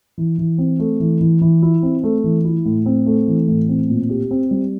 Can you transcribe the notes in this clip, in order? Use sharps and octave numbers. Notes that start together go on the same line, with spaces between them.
E3
E3
C4
A3
E3
E3
E3
E4
C4
A3
E3
E4
A2
C4
A3
E3
A2
C4
A#2
G4
C4
G3